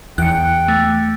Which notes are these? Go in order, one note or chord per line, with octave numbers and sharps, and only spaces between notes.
E2 G5 F#6 C#7
A3